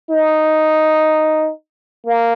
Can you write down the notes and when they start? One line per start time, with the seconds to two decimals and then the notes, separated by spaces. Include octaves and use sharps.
0.11 D#4
2.05 A#3